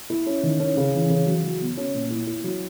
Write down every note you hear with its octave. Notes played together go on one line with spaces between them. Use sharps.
E4
C#4
D#3
C#4
C#3
E3
C#3
F#3
F#3
B3
C#4
A#2
E4
E4
F#3